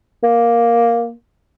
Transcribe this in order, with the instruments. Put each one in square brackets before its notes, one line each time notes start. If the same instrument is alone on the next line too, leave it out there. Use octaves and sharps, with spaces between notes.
[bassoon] A#3